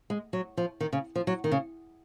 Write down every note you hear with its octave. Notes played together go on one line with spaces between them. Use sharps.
G#3
F#3
F3
D#3
C#3
F3
F#3
D#3
C#3